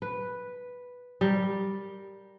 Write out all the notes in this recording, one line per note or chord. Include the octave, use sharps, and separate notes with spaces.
B4
G3 A#4